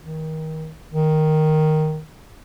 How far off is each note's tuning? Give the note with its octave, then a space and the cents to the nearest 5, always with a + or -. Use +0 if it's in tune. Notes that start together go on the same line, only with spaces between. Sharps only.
D#3 +25
D#3 +0